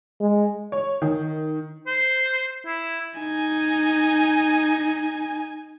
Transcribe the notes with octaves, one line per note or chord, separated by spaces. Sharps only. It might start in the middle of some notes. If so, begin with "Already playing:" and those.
G#3
C#5
D#3
C5
E4
D#4 G#5